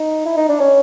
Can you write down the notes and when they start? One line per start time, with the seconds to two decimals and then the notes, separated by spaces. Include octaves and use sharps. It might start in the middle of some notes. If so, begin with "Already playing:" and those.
Already playing: D#4
0.26 E4
0.37 D#4
0.49 D4
0.60 C#4